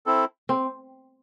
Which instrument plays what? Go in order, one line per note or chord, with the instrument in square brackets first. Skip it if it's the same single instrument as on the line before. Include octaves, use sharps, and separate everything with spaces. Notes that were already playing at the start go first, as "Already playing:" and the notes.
[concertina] C4 E4 A4
[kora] C4